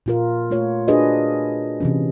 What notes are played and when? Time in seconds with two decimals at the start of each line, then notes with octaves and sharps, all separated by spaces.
0.06 A#2 F4 A#4
0.51 A3 F4 C#5
0.88 D4 F#4 G#4 A#4 B4 D#5
1.80 C3 E3 C#4